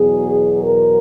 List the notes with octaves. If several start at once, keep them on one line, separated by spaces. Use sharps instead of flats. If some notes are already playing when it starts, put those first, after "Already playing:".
Already playing: E2 B2 F#3 G#4
A#4